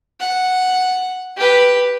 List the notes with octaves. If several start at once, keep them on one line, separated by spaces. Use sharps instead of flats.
F#5
G4 B4